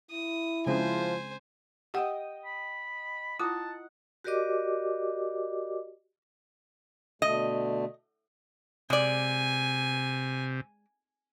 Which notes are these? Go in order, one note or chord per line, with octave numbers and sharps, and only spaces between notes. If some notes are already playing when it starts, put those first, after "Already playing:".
E4 D#6
C#3 F3 G#3 C4 C5 G#5
G4 D#5 F#5 G5 D#6
B5
E4 F4 F#5 A5 D#6
F#4 G4 A#4 D5 D#5 D6
B2 D3 A3 D#5
C3 G#3 D5 G#5